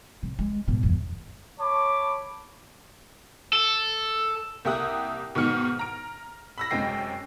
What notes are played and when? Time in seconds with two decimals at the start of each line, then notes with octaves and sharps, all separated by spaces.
0.23 C3
0.39 G#3
0.68 G#2 B2
0.83 G1 E2
1.60 C#5 A5 B5 D6
3.53 A4
4.65 C2 A#3 G4 E5 D#6 F#6
5.35 G#2 B2 D#3 F6 C#7
5.79 A#5 D7
6.58 B5 E6 A#6
6.71 F#2 C3 G#3 G5 C7